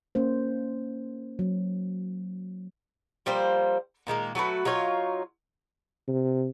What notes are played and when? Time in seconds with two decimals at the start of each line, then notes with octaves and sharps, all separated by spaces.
0.15 A#3 C#4 C5
1.39 F#3
3.26 F3 G3 A#3 C5
4.07 A#2 D#3 G#3 A#3
4.35 F#3 A3 F#4 B4
4.65 F#3 D#4 F4 C#5
6.08 C3